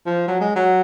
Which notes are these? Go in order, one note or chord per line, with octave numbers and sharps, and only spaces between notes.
F3
F#3
G#3
F#3